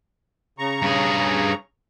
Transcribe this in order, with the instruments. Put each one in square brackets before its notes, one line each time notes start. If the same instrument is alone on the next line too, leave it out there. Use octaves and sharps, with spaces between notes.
[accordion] C#3 A#5 C#6
[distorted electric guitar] G2 G#4